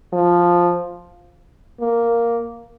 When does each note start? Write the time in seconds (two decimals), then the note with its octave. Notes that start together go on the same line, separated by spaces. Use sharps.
0.13 F3
1.80 A#3